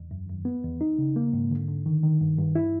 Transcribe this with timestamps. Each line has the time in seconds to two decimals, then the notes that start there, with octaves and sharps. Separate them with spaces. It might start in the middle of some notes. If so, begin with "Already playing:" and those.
Already playing: E2
0.11 F#2
0.29 F#2
0.45 B3
0.64 E2
0.81 D#4
0.98 C#3
1.16 A#3
1.33 G#2
1.51 D3
1.68 D3
1.86 D#3
2.03 D#3
2.21 G2
2.38 G2
2.55 E4